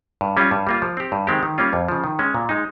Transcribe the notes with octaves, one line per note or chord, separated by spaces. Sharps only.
G2
G3 C#4 F4
G2
G3 A#3 F4
F3
C4 G4
G2
D#3 G#3 C4 G4
D#3
G3 A#3 C#4 F4
F2
C#3 F3
D#3
G#3 C#4
A#2
G#3 D#4